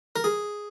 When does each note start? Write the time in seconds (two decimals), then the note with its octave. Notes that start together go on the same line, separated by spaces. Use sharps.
0.16 A#4
0.24 G#4